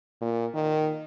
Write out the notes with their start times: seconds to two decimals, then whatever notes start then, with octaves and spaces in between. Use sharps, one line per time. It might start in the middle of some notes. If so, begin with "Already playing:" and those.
0.21 A#2
0.54 D#3